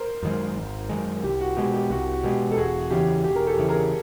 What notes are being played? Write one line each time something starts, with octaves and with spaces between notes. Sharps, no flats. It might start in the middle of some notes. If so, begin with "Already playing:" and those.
Already playing: A#4 C5
F#2 D#3 G#3
G#1
F#2 D#3 G#3
C2 G4
F#4
B2 G#3 G4
G4
C2 F#4
F#4
B2 G#3 G4
A4
E1 F#4 G#4
E2 C#3 E3 G4
E1 G4
A#4
G4 A4
E2 C#3 E3
G#4 A#4